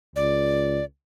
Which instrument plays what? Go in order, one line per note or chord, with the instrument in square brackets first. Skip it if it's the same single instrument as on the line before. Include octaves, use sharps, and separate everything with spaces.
[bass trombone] C#2 [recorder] D5